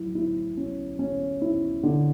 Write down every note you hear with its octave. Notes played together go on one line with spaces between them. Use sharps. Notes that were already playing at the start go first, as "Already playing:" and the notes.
Already playing: F#3 E4
E4
C#4
C#4
E4
D3